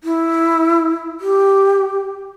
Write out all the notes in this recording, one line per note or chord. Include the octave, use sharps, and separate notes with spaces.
E4
G4